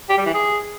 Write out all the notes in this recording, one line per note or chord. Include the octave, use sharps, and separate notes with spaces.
G4
G3
E3
G#4